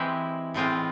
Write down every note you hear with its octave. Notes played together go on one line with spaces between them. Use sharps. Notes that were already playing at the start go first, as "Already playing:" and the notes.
Already playing: E3 G#3 C4 E4 G4
A2 E3 G#3 C4 F4